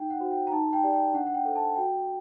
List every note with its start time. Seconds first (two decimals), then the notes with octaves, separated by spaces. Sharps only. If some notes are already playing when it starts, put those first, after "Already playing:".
Already playing: D#4 G5
0.10 F#5
0.20 F#4 C5
0.31 G5
0.47 A#5
0.51 D#4 A5
0.73 G5
0.83 G4 D5
0.93 G5
1.14 D4 F#5
1.27 F#5
1.34 G5
1.45 A4 C5
1.55 A5
1.76 F#4 G5